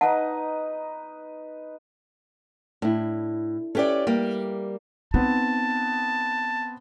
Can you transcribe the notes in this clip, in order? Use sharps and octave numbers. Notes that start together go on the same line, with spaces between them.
D#4 B4 D#5 F#5 A5
A2 D4 E4
C#4 G4 A4 B4 D5 E5
G3 A#3
B3 C4 D#4 A5